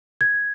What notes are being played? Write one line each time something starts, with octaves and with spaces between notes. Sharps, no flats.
G#6